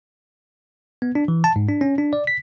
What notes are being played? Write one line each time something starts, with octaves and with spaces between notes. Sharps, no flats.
B3
D4
E3
A5
G#2
D4
C#4
D4
D5
B6